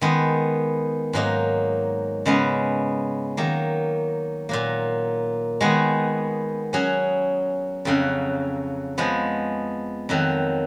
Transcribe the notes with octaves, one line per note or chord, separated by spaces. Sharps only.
D#3 G#3 B3
G#2 F#3 A#3 D#4
C#3 G#3 B3
D#3 F#3 A#3
A#2 F#3 A#3
D#3 G#3 B3 F#4
F#3 C#4 G#4
F2 C#3 F#3
F3 G#3 B3
F2 D#3 F#3